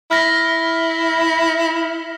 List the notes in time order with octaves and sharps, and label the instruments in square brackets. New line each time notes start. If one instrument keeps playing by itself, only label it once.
[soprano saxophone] E4 [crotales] F6 A#6 B6